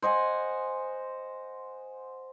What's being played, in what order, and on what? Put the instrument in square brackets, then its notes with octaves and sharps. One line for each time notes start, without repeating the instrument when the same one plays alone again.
[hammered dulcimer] C5 D#5 F#5 G#5